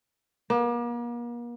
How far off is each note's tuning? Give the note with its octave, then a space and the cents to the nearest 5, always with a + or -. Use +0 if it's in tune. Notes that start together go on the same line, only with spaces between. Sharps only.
A#3 +40